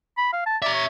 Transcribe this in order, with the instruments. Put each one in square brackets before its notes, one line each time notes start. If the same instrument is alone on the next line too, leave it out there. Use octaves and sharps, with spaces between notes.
[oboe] B5
F5
A5
[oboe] D5 [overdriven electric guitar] E5 A#5
[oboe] C#5